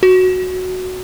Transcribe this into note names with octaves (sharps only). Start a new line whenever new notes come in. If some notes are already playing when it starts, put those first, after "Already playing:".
F#4